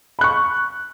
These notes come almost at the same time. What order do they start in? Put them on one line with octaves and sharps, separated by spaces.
B5 F#6 C#6